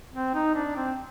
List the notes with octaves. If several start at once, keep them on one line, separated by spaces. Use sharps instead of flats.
C4
D#4
D4
C4